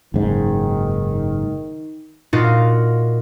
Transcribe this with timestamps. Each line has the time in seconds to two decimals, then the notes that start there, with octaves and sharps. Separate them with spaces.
0.14 F#1 G#2 D#3
2.33 A#2 D#4 F4 F#4